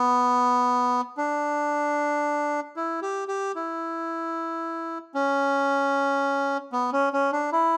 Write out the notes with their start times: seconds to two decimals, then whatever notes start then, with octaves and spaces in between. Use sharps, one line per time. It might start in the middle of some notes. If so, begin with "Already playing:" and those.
Already playing: B3
1.17 D4
2.76 E4
3.02 G4
3.28 G4
3.55 E4
5.14 C#4
6.72 B3
6.93 C#4
7.13 C#4
7.32 D4
7.52 E4